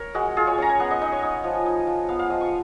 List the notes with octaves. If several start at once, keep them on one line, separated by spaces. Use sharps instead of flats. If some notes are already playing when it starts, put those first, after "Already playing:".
Already playing: A#4 C#5
G#3 F#4
F4 G#4
C#5
C#4 A#5
G#5
B3 F#5
D#5
D#4 D#5
C#5
D#4
F3
D#4
F3
B3 F5
F5
F3 D#5
C#6